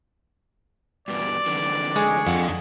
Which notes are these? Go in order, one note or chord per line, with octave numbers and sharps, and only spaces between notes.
G2 B2 E3 D5
F2 D3 E3
G#3 G#4 C#6
F2 D4 F#5